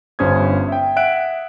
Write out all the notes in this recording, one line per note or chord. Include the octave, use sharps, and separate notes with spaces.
G1 G2 C#4 C5 D#6 G#6
E5 G5
E5 F#5 F#6 D7